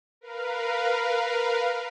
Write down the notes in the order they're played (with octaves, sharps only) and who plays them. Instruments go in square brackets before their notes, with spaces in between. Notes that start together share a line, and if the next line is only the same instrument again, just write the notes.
[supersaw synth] A#4 B4 F5